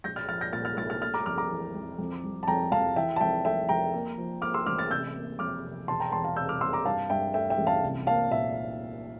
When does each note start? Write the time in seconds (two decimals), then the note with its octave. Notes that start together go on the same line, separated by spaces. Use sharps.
0.04 A#1 G6 A#6
0.16 F6 A6
0.28 F3 F6 A6
0.41 G6 A#6
0.53 A#2 F6 A6
0.65 F6 A6
0.77 A#1 F6 A6
0.90 F6 A6
1.02 A3 F6 A6
1.14 A#5 D6
1.26 F2 D6 F6
1.38 A#5 D6
1.50 E3
1.75 F2
1.99 F2
2.24 G3
2.43 A5
2.47 F2 G5 A#5
2.72 F2 F5 A5
2.96 E3 E5 G5
3.16 A5
3.20 F2 E5 G5
3.45 A3 E5 G5
3.69 F2 G5 A#5
3.94 A#3
4.17 F3
4.42 A#3 D6 F6
4.54 C6 E6
4.66 A1 D6 F6
4.78 F6 A6
4.91 C3 E6 G6
5.15 A#3
5.39 F2 D6 F6
5.64 C3
5.88 E1 A5 C6
6.00 G5 A#5
6.12 E2 A5 C6
6.24 F5 A5
6.36 C3 E6 G6
6.49 D6 F6
6.61 C3 C6 E6
6.73 A#5 D6
6.85 G2 F5 A5
7.10 G2 E5 G5
7.34 A3 E5 G5
7.50 E5 G5
7.58 A1
7.67 F5 A5
7.83 C2
8.07 A#3 F5 A5
8.31 A#2 E5